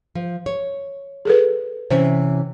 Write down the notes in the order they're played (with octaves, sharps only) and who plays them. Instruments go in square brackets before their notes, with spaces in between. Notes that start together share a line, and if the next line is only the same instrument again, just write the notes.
[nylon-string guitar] F3
C#5
[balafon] G#4 A4 B4
[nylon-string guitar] C3 E3 C#4 [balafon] C5